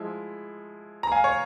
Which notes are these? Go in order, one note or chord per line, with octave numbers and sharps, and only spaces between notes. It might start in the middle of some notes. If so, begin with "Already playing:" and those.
Already playing: F3 G#3 E4
A#5
F5 G#5
C#5